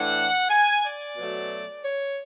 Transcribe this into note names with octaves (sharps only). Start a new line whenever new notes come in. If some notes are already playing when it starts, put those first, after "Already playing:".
Already playing: A2 E3 A3 D4 F#5
G#5
D5
B2 F#3 A3
C#5